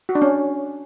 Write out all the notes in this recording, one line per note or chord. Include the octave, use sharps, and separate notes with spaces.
F#4
D4
C#4